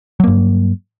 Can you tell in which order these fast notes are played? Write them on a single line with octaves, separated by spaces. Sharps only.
F#3 A#3 G2